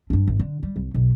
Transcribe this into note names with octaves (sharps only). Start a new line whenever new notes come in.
G2 D4
G#1
D3
G3
C2
B1